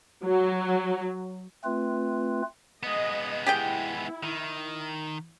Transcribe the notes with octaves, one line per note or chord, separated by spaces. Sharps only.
F#3
A3 C4 F4 B4
G#3 B3 D#5
E4 G4 G#4 G5
D#3